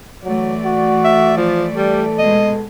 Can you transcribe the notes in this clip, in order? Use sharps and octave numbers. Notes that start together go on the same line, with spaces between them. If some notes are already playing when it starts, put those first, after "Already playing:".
E3 F#3 A3 D5
F#4
E5
F3
G3 A4
B2 G#3 D#5